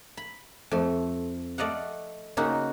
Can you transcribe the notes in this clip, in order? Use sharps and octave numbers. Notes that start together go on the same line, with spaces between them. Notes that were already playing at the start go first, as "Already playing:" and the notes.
B5
F2 A3
A3 D5 D#5 F5 F#5
C#3 A#3 D#4 F#4